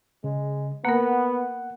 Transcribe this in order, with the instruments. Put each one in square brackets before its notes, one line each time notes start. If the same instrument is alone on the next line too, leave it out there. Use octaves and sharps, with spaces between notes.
[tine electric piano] C#3 [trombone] G#3
[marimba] A#3 A#4 [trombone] B3 [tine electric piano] F#5